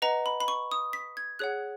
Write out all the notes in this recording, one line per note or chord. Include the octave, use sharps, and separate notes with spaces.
B4 D#5 F#5 A#5
B5
B5
C#6
D#6
B6
G#6
G#4 C#5 F#5 F#6